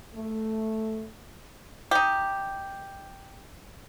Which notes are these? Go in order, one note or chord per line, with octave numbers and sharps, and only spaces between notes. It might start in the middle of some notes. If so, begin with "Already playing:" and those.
A3
D#4 G4